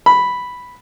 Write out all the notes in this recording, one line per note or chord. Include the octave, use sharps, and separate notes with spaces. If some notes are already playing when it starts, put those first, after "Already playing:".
B5